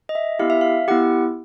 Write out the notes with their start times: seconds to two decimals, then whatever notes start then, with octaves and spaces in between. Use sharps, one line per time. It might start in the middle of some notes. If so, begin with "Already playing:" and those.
0.09 D#5
0.15 E5
0.39 B3 E4 G4 F5
0.50 E5
0.61 F5
0.88 B3 E4 G4 F#5